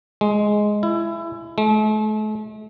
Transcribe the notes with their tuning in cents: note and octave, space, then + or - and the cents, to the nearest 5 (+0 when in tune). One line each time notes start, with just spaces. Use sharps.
G#3 +5
E4 +25
A3 -40